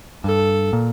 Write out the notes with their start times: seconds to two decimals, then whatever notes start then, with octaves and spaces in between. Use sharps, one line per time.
0.24 G2 A4
0.73 A#2